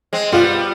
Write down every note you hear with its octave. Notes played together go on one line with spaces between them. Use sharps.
G#3 C4
G3 B3 F4